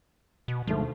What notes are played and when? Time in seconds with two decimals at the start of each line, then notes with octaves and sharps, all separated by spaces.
0.48 B2
0.67 D2 G#2 F3 A3